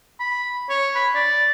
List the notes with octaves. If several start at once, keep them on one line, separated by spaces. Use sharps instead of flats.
B5
C#5
B5
D5